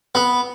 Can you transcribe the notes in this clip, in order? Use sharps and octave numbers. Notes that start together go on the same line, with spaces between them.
B3